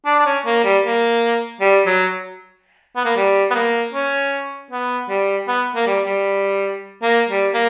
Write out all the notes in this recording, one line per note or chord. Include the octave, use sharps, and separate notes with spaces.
D4
D4
C#4
A#3
G3
A#3
G3
F#3
B3
A#3
G3
B3
A#3
C#4
B3
G3
B3
A#3
G3
G3
A#3
G3
A#3